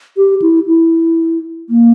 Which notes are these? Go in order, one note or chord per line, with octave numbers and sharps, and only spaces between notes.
G4
E4
E4
A#3